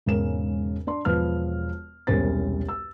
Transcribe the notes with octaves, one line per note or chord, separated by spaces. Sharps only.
E1 G#2 C#3 C#4 A#4 E7
D4 D5 C6
E1 F3 B4 F6
E1 C2 C#4 A#4 C5 A6
E6